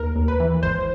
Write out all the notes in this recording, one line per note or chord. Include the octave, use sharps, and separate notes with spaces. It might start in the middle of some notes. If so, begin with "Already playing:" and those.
Already playing: D#2 A#4
D#2
B4
E3
G#1 C5